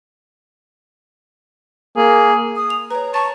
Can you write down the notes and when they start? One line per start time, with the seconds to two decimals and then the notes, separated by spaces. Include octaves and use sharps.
1.96 A#3 G#4
2.55 D#6
2.70 F7
2.91 B4 C#5 A#5
3.14 A5 C#6 A6